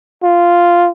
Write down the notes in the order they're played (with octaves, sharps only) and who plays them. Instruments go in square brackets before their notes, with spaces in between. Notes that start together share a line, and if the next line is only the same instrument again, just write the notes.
[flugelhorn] F4